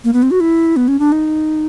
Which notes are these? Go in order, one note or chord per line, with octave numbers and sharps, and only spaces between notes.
A#3
B3
C4
F#4
E4
B3
C#4
D4
D#4